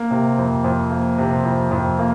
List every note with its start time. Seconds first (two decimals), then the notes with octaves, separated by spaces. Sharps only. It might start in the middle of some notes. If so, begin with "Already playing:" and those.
Already playing: A#3
0.11 C3
0.38 F2
0.64 F2
0.91 A#3
1.18 C3
1.44 F2
1.71 F2
1.99 A#3